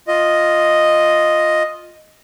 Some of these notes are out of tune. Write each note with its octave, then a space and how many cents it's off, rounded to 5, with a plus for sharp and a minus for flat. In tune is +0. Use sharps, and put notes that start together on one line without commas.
F4 +0 D#5 +0